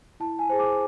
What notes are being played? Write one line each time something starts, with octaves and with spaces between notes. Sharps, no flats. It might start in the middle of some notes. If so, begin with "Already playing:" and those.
E4 A5
G#5
G#4 C5
D6